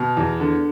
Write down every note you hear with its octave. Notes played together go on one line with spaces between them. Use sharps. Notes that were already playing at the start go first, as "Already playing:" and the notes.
Already playing: B2 F6
E2
D3